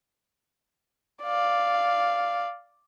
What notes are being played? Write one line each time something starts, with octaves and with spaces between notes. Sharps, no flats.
D5 F5